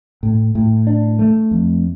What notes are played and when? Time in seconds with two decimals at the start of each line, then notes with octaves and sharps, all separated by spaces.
0.23 A2
0.55 A2
0.87 D4
1.19 A3
1.51 F2